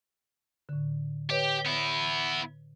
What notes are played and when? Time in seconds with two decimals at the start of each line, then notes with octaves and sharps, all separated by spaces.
0.69 A2 D3
1.30 G4 B4 C#5 D#5
1.66 B3 E4